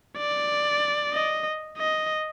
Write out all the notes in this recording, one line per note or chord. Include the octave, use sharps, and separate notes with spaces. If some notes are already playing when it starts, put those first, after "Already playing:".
D5
D#5
D#5